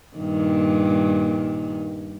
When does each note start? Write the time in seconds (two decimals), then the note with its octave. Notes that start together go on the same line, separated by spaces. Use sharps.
0.17 G2 A#2 D#3